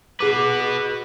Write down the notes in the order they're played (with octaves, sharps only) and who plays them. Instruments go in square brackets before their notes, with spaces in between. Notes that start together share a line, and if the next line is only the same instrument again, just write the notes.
[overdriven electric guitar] F#4 B4 [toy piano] G#4 D6